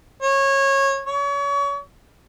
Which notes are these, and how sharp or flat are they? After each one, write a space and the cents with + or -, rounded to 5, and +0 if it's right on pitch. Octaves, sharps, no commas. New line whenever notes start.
C#5 -20
C#5 +35